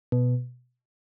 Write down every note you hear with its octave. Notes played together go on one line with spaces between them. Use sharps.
B2